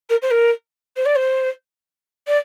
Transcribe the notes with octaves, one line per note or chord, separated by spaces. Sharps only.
A#4
C5
A#4
C5
D5
C5
D5